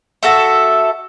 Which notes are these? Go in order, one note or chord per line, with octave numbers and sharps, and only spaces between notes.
F#4 A4 E5